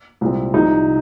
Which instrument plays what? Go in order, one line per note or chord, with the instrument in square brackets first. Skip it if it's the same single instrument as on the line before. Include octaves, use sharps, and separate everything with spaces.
[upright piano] C2 A#2 G#3 C4
C2 C3 F3 D#4